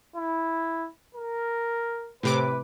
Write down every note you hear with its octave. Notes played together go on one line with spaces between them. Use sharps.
E4
A#4
A2 C3 B4 D6